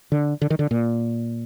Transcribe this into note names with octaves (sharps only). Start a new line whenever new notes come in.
D3
D3
D#3
D3
A#2